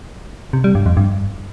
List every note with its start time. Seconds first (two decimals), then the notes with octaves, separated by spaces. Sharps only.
0.53 C3
0.64 G3
0.75 G2
0.86 F2
0.97 G2